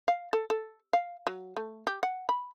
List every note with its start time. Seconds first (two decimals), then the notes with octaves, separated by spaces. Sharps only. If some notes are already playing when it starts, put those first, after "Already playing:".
0.08 F5
0.33 A4
0.50 A4
0.93 F5
1.27 F#3
1.57 A3
1.87 G4
2.03 F#5
2.29 B5